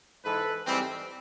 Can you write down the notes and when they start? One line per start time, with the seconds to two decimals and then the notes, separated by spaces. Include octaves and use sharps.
0.24 G#2 E3 G#3 A4 B4
0.66 G#2 E3 G3 C4